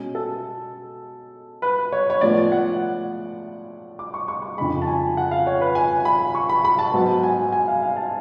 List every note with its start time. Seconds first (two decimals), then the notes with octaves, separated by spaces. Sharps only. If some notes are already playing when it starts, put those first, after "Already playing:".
Already playing: B2 G#3 C#4
0.15 A4
1.62 B4
1.92 C#5
2.10 C#5
2.21 A2 F3 G#3 B3 D5
2.52 F#5
3.99 D6
4.14 C#6
4.28 C#6
4.42 C#6
4.57 F2 C#3 G#3 B5
4.82 A5
4.87 G#5
5.17 F#5
5.31 F5
5.47 C#5
5.61 B4
5.75 G#5
6.05 B5
6.35 C#6
6.49 B5
6.65 B5
6.79 A5
6.93 G#2 F#3 B3
7.23 G#5
7.52 G#5
7.68 F5
7.82 F5
7.97 A5